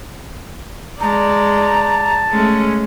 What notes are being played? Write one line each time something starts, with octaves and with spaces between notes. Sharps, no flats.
G#3 D5 A5 A#5
G#3 A3 C#4